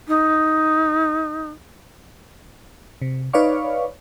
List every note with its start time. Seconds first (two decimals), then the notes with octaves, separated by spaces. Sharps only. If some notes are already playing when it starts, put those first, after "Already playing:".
0.08 D#4
3.02 C3
3.33 D#4 B4 C#5 D5 F5 C#6